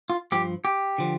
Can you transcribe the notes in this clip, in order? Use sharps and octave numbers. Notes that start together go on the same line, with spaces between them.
F4
G2 F3 G4
G4
D3 F3